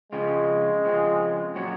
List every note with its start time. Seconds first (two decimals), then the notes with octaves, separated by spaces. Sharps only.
0.12 C#3 F3 G#3 C4 F4
0.84 C#3 F3 C4 F4
1.55 A#2 F#3 C#4 F#4